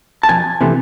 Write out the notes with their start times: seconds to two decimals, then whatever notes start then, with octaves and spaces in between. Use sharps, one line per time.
0.23 A5
0.29 F2 G#5
0.61 C3 E3 A3